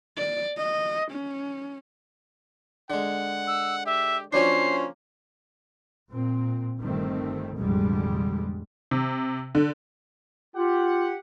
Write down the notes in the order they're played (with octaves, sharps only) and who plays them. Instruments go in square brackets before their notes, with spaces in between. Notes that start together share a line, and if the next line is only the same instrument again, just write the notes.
[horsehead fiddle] D5
D#5
C#4
[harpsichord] D3 G#3 [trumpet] F#5
[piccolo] E6
[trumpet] G4 [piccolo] E5
[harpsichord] F3 F#3 D4 [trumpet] A#3 [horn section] C#4 C5 C#5 [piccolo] C7
[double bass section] A#2 C4
G1 D#3 G3 A3 C4
A1 F2 B2 D3 G3 G#3
[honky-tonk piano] C3
D3
[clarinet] F4 [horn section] G4 F#5